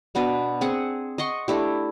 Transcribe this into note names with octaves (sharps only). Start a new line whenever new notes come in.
B2 B3 D4 B4
C4 G#4 F#5
D#5 F#5 C6 C#6
A3 D4 E4 G4